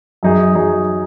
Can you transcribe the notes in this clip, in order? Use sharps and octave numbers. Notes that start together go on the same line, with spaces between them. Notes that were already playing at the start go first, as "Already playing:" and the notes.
F#2 F#3 D#4 G#4
F#3 D#4 G#4